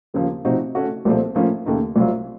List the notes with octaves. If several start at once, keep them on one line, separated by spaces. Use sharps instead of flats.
D#2 C#3 F3 A#3
C3 F3 C4 D#4 F#4
C#3 A3 C#4 F#4
C2 A#2 F3 A3 C4
A2 F3 A#3 C#4 F4
D#2 C#3 A3 D#4
C2 C3 F#3 C4 F4